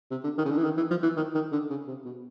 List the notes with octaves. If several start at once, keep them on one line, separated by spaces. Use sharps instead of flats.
C3
D3
D#3
C#3
D3
E3
D#3
E3
F3
E3
D#3
D#3
D3
C#3
C3
B2